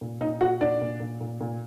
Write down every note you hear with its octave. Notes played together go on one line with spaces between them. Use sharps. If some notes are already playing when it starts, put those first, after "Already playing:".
A#2
A#2 D#4 D#5
A#2 F#4 F#5
A#2 D4 D5
A#2
A#2
A#2
A#2